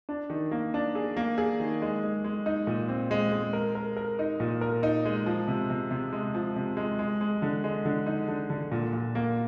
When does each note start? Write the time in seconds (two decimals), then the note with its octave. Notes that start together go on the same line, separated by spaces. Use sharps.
0.09 D4
0.30 D#3
0.51 A#3
0.74 D4
0.95 G#4
1.17 A#3
1.38 G#4
1.60 D#3
1.82 G#3
2.03 G#3
2.25 G#3
2.46 D#4
2.67 A#2
2.89 C4
3.11 G#3
3.32 G#3
3.53 A#4
3.75 A#4
3.97 A#4
4.19 D#4
4.40 A#2
4.61 A#4
4.83 D#4
5.05 G#3
5.26 F3
5.48 C3
5.70 C3
5.91 C3
6.13 G#3
6.35 F3
6.56 C3
6.77 G#3
6.99 G#3
7.21 G#3
7.42 D3
7.64 G#3
7.85 D3
8.06 D#4
8.28 D3
8.50 D3
8.72 A#2
8.93 A#2
9.15 A#3